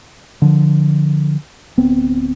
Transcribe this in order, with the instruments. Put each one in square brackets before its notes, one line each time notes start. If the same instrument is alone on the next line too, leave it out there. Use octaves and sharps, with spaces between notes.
[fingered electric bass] D3 F3
D1 B3 C4